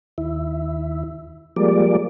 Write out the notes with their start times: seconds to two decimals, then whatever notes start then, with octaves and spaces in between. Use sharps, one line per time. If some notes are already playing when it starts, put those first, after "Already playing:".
0.18 D#2 E4
1.56 F3 G3 G#3 A#3 D5